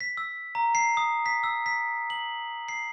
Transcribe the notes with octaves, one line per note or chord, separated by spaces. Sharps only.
B6
E6
A#5
C7
D#6
B6
E6
B6
F#7
C7